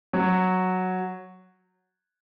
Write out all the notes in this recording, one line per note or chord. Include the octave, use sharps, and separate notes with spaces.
F#3